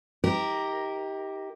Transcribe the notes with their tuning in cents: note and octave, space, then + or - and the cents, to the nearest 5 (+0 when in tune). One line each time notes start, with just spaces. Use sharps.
D#4 +40 G4 +0 A#4 +0